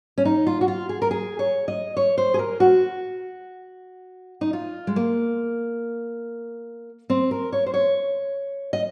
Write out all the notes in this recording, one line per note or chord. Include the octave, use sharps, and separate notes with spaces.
C#4
D#4
F4
F#4
F4
G#4
A#4
G#4
C#5
D#5
C#5
C5
G#4
A#4
F#4
D#4
F4
G#3
A#3
C4
A#4
C#5
C5
C#5
D#5